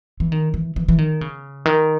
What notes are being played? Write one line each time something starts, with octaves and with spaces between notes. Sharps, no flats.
E3
D#3
E3
E3
E3
D#3
C#3
D#3